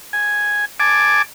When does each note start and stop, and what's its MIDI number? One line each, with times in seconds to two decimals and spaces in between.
0.13 0.65 80
0.80 1.22 80
0.80 1.22 81
0.80 1.22 86